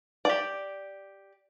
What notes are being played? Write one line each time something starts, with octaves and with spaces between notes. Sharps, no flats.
G4 D5